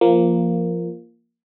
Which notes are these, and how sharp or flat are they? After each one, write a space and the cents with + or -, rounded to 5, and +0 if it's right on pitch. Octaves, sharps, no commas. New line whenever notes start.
F3 -15 A#3 +0